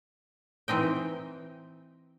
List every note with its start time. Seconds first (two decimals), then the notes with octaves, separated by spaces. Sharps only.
0.68 E3 C4 D#4 G5